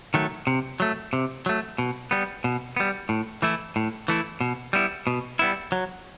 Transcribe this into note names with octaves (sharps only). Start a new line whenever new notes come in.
D#3 F#3 A3
C3
F#3 A3
C3
F#3 A3
B2
G3 B3
B2
G3 B3
A2
E3 A3 E4
A2
E3 A3 E4
B2
G3 B3 E4
B2
G3 B3 E4
F#3